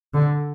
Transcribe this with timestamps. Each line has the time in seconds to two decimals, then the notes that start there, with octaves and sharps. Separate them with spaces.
0.14 D3